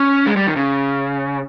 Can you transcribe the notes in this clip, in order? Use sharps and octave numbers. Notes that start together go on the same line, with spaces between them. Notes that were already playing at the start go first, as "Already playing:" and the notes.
Already playing: C#4
G#3
G3
D#3
C#3